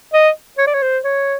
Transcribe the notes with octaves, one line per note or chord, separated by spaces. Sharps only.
D#5
C#5
D5
C#5
C5
C#5